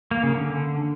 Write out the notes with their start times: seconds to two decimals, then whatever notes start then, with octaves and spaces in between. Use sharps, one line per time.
0.11 A#3
0.23 C#3
0.35 D3